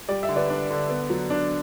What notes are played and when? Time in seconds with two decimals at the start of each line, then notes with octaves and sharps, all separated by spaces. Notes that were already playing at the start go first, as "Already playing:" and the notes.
0.09 G3 D5
0.23 E5
0.29 D3
0.36 B4 D5
0.50 D4
0.70 D3
0.90 B3
1.10 F#3
1.30 D4